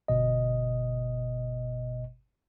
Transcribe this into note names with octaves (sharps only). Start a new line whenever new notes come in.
G1 B2 D#5